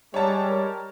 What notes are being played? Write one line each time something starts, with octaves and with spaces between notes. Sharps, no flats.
G3 G#3 C#5 A5
A#4